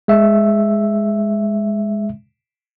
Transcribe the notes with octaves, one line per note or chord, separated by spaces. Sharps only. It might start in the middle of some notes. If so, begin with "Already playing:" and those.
G#3 E5